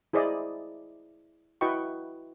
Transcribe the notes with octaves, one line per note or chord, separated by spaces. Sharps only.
E4 G#4 C5 D5 D#5
E4 F#4 B4 D#5 G5 C#6